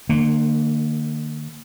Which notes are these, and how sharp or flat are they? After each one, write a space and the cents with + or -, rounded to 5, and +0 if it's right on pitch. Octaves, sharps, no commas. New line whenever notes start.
D3 +40 A#3 -30